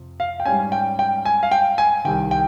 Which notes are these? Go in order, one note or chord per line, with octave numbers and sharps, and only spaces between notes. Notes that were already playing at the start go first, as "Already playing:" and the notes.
Already playing: F2 C3
F5
G5
G#2 G3 C#4 G#5
G5
G5
G#5
F5
G5
G#5
C2 C3 D#3 G5
G5